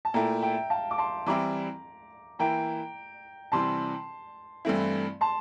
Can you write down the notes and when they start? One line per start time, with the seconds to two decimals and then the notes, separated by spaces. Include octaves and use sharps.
0.05 A5
0.14 A#2 A3 E4 G5 A#5
0.43 E5 G5
0.70 F5 A5
0.91 D6
0.98 A5 C6
1.26 E3 G3 C4 E4 A#5 D6
2.39 E3 A#3 E4 G5 A#5
3.52 C3 E3 G3 C4 A5 C6
4.65 G2 E3 A3 C4 E4
5.21 A5 C6